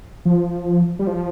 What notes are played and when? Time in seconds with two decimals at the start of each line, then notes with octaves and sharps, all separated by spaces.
0.25 F3
0.99 G3
1.07 F3